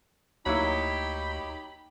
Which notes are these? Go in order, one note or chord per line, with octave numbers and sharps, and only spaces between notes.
D2 F#3 A#3 D#4 E4 G4 B5